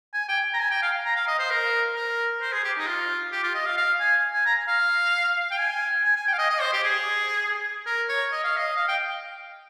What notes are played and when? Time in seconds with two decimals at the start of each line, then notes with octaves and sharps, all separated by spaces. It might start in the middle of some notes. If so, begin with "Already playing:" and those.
0.14 G#5
0.28 G5
0.54 A#5
0.59 G#5
0.71 G5
0.82 F5
1.05 A#5
1.16 F5
1.28 D#5
1.39 C5
1.50 A#4
1.95 A#4
2.41 C5
2.52 G#4
2.64 G4
2.78 D#4
2.87 F4
3.32 G4
3.43 F4
3.55 D#5
3.66 F5
3.77 F5
4.00 G#5
4.34 G#5
4.46 A#5
4.68 F5
5.51 G5
5.59 G#5
6.05 G#5
6.16 G#5
6.28 G5
6.33 F5
6.38 D#5
6.50 D#5
6.61 C5
6.73 G4
6.84 G#4
7.86 A#4
8.09 C#5
8.32 D#5
8.44 F5
8.57 D#5
8.77 F5
8.88 G5